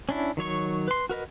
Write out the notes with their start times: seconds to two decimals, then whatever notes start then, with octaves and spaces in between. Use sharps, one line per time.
0.09 C#4 D4 E4
0.37 D#3 F#3 C#5 C#6
0.88 B4 C6
1.09 F#4 A#4 B4 D#5